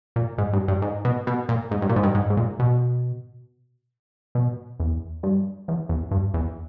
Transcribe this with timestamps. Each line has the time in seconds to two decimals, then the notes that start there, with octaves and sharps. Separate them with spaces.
0.16 A#2
0.38 G#2
0.53 G2
0.68 G2
0.82 G#2
1.05 B2
1.27 B2
1.49 A#2
1.71 G#2
1.82 G2
1.89 A#2
1.96 G#2
2.03 G2
2.15 G#2
2.30 G#2
2.37 A#2
2.59 B2
4.35 B2
4.80 E2
5.23 G2
5.68 E2
5.89 E2
6.11 G2
6.34 E2